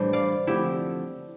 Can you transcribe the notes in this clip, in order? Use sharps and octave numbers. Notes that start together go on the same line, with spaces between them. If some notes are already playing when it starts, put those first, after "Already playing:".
Already playing: A2 E3 G3 D4 C5
D5 F5
D3 F3 A3 C4 E4 G4